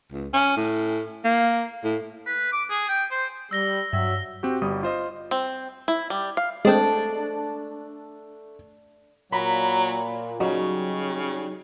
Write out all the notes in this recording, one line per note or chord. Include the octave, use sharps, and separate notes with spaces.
C#2
C#4
A2
A#3
A2
B4
D6
G#4
G5
C5
G3 E6 A#6 G7
G2 F#3 E5
C4 F#4 G4
G1 G3 D#6
F4 C5 D#5
C4
E4
G3
F5
G#3 A3 C4 D4 D5
A#2 F#3 A#5 B5
C#3 F#3 G3 D#4 G4 C#5